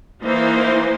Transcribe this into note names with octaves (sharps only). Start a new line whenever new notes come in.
E3 A#3 D#4 C5